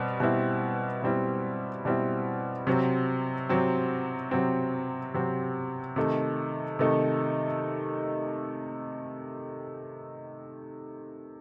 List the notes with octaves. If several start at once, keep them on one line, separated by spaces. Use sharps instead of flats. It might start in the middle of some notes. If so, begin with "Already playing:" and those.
Already playing: B2 G3 C4
B2 G3 C4 E4
B2 G3 C4 E4
B2 G3 C4 E4
C3 F#3 C4
C3 F#3 C4
C3 F#3 C4
C3 F#3 C4
C3 D#3 A3 D#4
C3 D#3 A3 D#4